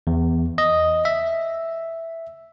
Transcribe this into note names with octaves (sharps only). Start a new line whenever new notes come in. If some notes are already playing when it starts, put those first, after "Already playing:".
E2
D#5
E5